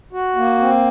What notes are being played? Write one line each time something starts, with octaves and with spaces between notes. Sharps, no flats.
F#4
A#3
C4